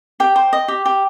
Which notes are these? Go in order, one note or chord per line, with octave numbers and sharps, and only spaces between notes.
G4 G5
C5
D#5
G4
G4